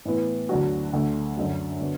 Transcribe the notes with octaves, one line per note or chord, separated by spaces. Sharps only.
A2 E3 B3
D2 D3 F#3 D4 F#4
D2 D3 A3
F#2 D3 F#3
D3 F#3 B3